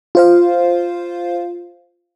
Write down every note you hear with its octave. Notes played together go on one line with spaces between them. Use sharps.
F4 C5 F5